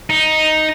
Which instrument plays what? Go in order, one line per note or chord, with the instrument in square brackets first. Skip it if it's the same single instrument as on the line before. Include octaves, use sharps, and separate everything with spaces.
[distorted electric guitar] D#4